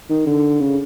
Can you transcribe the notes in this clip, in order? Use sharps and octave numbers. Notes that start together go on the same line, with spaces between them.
D#3
D3
C#3